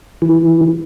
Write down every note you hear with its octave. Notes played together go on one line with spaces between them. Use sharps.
E3